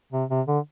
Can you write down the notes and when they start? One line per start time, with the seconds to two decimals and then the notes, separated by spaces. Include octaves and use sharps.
0.12 C3
0.30 C3
0.47 D3